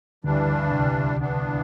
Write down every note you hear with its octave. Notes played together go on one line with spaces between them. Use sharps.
D2 G2 D3 E3 G3 D4
C2 C3
G2 E3 B3 D4